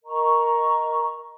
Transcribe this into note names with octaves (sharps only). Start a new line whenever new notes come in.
A#4 D#5 A#5 C#6